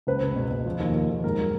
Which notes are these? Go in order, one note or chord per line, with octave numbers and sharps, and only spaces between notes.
C#2 B4
C#2
B2
B2
F3
D#2
D#2
D#2
G#2 A#4
F#3